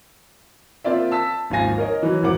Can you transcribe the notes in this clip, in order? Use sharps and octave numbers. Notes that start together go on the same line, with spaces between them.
A#3 C4 F4 D5 E5
A5 E6 B6
G#1 D#2 F3 F5 G#5 A#6
A#4 C#5 D#5
E3 F#3
G#1 F2 A#4 F#5 D6